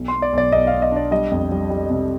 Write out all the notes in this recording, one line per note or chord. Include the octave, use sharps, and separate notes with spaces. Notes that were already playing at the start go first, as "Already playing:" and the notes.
Already playing: B1
C6
B3
D5
B1 D5
B1 D#5
F5
B1
D#5
D4 D5
G3 D#5
F2
G3
G3
C3